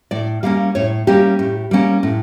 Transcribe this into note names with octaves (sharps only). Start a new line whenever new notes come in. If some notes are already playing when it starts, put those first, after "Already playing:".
A2 D5
G3 A#3 C#4 F5
A2 C#5
G3 A#3 C#4 G4
A2
G3 A#3 C#4
A2